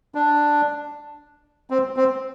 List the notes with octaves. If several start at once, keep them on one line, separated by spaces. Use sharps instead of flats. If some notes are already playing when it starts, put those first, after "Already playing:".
D4
C4
C4